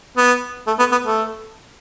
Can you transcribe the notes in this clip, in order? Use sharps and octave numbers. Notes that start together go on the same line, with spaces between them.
B3
A3
B3
B3
A3